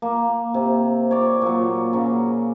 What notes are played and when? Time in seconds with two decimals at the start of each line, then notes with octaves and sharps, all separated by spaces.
0.02 A#3
0.54 C3
1.11 C#5 D5
1.42 A#2 F#3
1.93 C#3 F#3